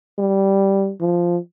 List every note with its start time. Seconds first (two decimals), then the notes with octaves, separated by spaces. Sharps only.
0.18 G3
1.00 F3